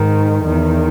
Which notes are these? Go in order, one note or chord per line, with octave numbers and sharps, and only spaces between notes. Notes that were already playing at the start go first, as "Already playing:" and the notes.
Already playing: G#2 D#3
E2 D#3